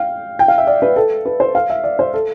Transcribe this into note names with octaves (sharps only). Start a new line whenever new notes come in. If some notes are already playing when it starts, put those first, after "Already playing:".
Already playing: F5 G5
G5
F5
E5
D5
B4
A4
B4
C5
F5
E5
D5
C5
A4